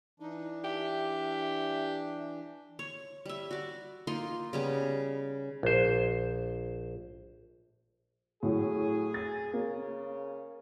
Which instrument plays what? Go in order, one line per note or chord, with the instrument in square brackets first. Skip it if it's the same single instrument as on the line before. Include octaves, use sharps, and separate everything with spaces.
[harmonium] E3 D4 [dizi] D#4
[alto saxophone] G4 [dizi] E5
[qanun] C#5
G3 E5
F#4 D5
A#3 D#4 F4 C6
C#3 G3 B3
[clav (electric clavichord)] A#1 C5
[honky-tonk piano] A2 F#3 [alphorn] G#4
[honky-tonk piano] A6
[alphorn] C#3 [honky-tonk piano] A#3